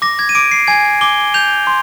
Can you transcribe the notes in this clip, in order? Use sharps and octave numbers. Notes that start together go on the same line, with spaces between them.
D6 A#6
G#6
D#7
D6 D7
C7
G#5 G#6
D6 G7
G6 F7
C6